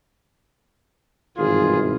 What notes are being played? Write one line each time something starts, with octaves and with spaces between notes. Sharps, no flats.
G#1 G2 B2 E3 F4 G#4